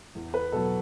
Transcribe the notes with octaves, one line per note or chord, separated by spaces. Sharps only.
E2
B4
B2 F#3 A4